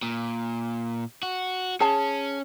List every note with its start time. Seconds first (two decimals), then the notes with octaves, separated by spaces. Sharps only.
0.03 A#2
1.23 F#4
1.80 C#4 G#4 A5